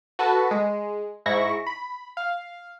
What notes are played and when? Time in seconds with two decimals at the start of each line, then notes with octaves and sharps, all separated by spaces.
0.19 F#4 A4 B4 A5
0.51 G#3
1.26 G#2 E4 C#6 A#6
1.67 B5
2.17 F5